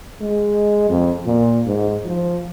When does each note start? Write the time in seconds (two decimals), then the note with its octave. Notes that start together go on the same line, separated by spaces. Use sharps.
0.21 G#3
0.89 F2
1.26 A#2
1.66 G#2
2.06 F3